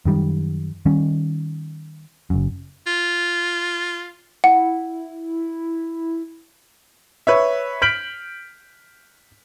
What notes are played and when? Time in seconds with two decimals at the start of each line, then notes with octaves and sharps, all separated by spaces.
0.05 F#2 D#3 G3
0.86 D#3 G3 C#4
2.30 F#1 F#2
2.87 F4
4.44 E4 F#5
7.27 B4 C#5 E5
7.82 F6 G6 B6 D7 F#7